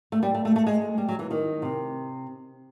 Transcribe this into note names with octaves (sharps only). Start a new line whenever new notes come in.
A3
G3
A3
A3
A3
G#3
G3
F#3
E3
D#3
C3